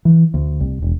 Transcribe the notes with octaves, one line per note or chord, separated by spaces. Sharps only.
E3
D2
C2
E1